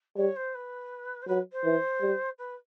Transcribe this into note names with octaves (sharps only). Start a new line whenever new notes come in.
G3 C#5
C5
B4
C5
F#3 B4
C5
E3
G3
B4